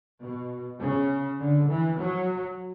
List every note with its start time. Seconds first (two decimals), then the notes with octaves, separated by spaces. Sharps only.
0.20 B2
0.79 C#3
1.38 D3
1.68 E3
1.98 F#3